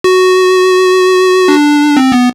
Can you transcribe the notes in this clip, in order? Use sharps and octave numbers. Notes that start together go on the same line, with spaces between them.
F#4
D4
C4
B3